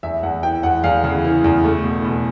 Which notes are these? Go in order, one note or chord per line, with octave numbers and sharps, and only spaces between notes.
E2 E5
E2 F#5
E3 G5
E2 F#5
E2 F5
C#3
E3
E2
A3
B2
B2